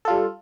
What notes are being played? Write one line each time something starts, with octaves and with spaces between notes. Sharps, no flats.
G3 F4 A4